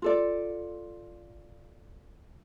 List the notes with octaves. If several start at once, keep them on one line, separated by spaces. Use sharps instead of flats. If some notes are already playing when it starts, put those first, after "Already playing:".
F4 A4 D5